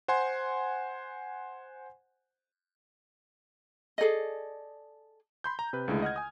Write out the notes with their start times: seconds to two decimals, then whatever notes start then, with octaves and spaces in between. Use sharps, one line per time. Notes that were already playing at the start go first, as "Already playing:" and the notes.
0.08 C5 F#5 G#5 C6
3.98 G#4 A4 D5 D#5
5.44 B5 C6 G6
5.59 A#5
5.73 C3 B4
5.88 C#2 D3 G#3 A3 E4 G#4
6.02 D#5 F#5 F6 G#6
6.16 G#5 D#6